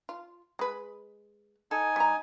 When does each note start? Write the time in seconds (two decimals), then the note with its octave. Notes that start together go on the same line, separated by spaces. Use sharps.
0.09 F4
0.59 G#3 B4
1.71 D#4 A4 G#5
1.96 G3 A#5